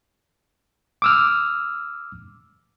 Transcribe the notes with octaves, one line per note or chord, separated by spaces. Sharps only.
D6 E6 F6